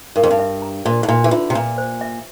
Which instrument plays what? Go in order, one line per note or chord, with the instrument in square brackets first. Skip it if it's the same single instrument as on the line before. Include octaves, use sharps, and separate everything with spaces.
[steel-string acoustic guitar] G2 [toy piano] A#4
[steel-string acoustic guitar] F2
G2
[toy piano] E5
A#5
[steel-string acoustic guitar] A#2 [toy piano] C5
[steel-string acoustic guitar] A2
[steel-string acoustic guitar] A#2 [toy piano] E5
[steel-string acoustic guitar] E3
[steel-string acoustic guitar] D3 [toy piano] F4
[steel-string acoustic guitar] C3
[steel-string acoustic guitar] A#2 [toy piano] A#5
[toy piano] C5
E5